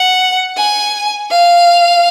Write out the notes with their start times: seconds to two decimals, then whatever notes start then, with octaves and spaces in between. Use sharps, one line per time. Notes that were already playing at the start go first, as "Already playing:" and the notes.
Already playing: F#5
0.57 G#5
1.31 F5